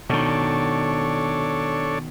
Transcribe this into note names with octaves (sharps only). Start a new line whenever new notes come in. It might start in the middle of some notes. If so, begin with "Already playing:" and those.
B2 D#3 D4 A4 C#5